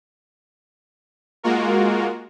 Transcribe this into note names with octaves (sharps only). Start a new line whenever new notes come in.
G#3 A#3 F4 F#4 A#4